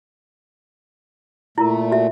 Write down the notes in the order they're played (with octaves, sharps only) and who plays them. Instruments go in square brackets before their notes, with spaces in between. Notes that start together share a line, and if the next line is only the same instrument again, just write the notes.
[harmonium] A#2 A3 [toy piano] E4 F4 A#4
[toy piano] F#4 E5